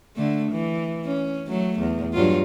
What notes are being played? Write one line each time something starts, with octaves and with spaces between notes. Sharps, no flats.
D3 A3
E3
C#4
F#3 A3
E2
G2 F#3 F4